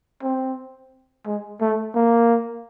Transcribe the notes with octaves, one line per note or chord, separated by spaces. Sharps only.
C4
G#3
A3
A#3